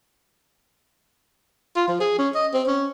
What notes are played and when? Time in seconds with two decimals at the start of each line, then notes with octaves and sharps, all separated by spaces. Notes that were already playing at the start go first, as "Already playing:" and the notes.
1.76 F4
1.88 F3
2.00 G#4
2.19 C#4
2.35 D#5
2.54 C4
2.67 C#4